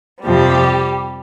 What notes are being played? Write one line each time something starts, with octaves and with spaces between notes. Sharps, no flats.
F2 C3 F3 G3 G4